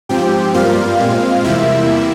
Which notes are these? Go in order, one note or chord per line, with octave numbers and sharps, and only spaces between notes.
G#2 F3 C4 G4 G5
G2 G3 A#3 F4 F5
A#2 G#3 C4
E2 C3 G3 A#3 E4 E5